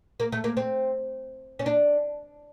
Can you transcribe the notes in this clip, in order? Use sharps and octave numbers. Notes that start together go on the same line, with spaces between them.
A#3
A3
A#3
C4
C#4
D4